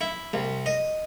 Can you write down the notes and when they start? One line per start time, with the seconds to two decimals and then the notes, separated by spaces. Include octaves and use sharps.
0.01 E4
0.33 C2
0.66 D#5